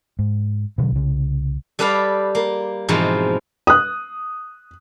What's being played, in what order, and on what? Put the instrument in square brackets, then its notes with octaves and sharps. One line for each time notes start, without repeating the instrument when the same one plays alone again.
[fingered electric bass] G#2
B2 D3 F3 F#3
C2 C#3
[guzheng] G3 A4 B4 D5 F5
A#3
G#2 B2 E3 F3 C4
[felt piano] D#6 F#6